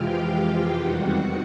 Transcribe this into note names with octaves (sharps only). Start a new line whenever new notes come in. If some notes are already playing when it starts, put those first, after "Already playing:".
Already playing: F2 C3 E3 G#3 F4 G4 F5 G5
E2 C3 D#3 G3 F#4 F#5